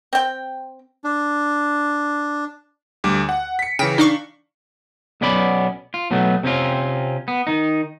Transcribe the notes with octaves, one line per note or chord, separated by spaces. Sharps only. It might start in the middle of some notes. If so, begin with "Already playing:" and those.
C4 G5
D4
D2 G3 D6
F#5
B6 C#7
C#3 E3 G5
D4 D#4 F5 C#6
B1 B2 B3 C#4 D5 B5
F4
B2 F#3 A3 B3
C3 C4 C#4 F4
B3
D#3 D#4